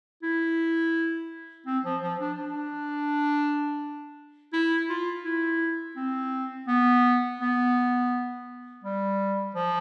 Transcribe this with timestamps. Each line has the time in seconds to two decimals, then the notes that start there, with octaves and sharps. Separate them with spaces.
0.23 E4
1.67 C4
1.85 F3
2.03 F3
2.20 D4
2.38 D4
4.53 E4
4.89 F4
5.25 E4
5.96 C4
6.68 B3
7.40 B3
8.84 G3
9.55 F3